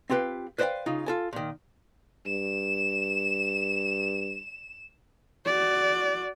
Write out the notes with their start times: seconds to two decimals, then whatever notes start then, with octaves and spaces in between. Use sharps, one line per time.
0.10 C4 F4 G4 B4 F5
0.58 B4 C5 D5 D#5 F5 G5
0.86 C#3 D#4 F4
1.06 F4 A4 G#5
1.33 A#2 D#3
2.26 G2 E7
5.46 F#4 D5